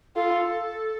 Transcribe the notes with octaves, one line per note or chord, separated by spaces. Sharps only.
F4 A4